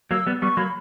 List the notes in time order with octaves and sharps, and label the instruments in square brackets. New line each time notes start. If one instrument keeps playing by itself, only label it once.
[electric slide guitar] F#3 A#3 [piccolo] E6
[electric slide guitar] G3 B3
[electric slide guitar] G3 B3 [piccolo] C#6
[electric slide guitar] F#3 A#3 [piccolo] B5